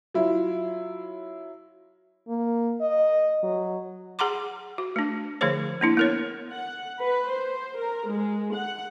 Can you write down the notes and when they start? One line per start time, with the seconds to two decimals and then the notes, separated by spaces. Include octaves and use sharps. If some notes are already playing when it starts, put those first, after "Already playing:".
0.14 F#3 E4 F4
2.28 A#3
2.81 D#5
3.43 F#3
4.19 G#4 F#5 A#5 C6 D6
4.78 F#4
4.96 A3 D4
5.41 D3 F3 A3 G#4 C5 C#5
5.81 A#3 D4 E4
5.97 B3 A#4 C#5
6.53 F#5
7.01 B4
7.31 C5
7.78 A#4
8.09 G#3
8.54 F#5